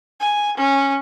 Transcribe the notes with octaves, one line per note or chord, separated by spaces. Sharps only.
G#5
C#4